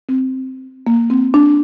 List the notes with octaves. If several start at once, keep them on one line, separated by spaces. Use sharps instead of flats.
C4
A#3
C4
D4